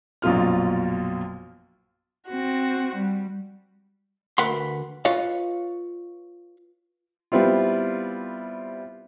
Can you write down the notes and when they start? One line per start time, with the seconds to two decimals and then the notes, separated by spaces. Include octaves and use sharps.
0.22 A#1 F#2 B2 F4 F6
2.28 C4 F#4
2.95 G3
4.38 D2 A#4 B4 F#5 C6
5.05 F4 B4 C#5 D#5 F5
7.32 G3 B3 C4 E4 F4